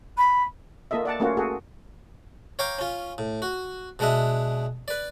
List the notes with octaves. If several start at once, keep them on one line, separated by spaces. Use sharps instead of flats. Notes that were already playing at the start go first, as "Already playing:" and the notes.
B5
A#3 F4 A4 D#5 E5
D5 F#5 A5
A3 A#3 C#4 F4 F#4
F#4 G#4 A4
C#5 F5 G5 A#5 D6
C#4 F4
A2
F#4
B2 G#3 D4 D#5 E5
B4 D5